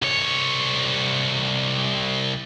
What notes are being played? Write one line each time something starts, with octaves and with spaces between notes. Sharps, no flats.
C2 C#5